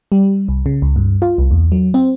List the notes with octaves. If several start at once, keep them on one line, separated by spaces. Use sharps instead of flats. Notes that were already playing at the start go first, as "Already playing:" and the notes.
G3
C2
C#3
C#2
G2
F4
C2
E2
F#3
C4